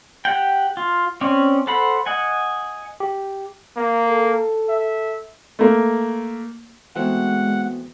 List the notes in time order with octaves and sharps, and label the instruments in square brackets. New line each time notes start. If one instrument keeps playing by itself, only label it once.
[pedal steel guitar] G4 F#5 G5
F4
C4 C#4 D5
A4 C5 F#5 B5
D#5 F#5 G#5
[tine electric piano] G4
[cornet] A#3
[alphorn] A4
[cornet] E5
[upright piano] A3 A#3
[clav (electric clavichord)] E3 A3 C4 [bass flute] G#3 [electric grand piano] B3 F#4 [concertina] F#5